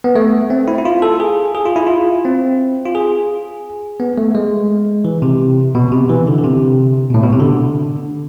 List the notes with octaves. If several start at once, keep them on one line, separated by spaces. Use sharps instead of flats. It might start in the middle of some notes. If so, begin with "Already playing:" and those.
B3
A3
C4
E4
E4
F4
A4
G#4
G#4
F4
E4
F4
C4
F4
G#4
B3
A3
G#3
E3
C3
B2
C3
E3
D3
D3
C3
B2
A2
B2
C3
D3